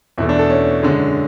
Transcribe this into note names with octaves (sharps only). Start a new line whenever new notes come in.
E2 B2 A3 E4
D4
A4
C#4
F#2 D3 G#3